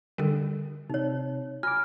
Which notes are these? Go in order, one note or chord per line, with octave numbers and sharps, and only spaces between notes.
D3 G3 A4 A#4
C3 D#4 C#5
F4 G#5 D6 F6